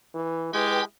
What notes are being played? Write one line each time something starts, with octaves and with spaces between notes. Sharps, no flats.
E3
G#3 E4 G4 B4 G5 G#5